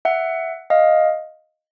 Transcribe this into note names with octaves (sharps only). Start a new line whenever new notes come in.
E5 F#5
D#5 F5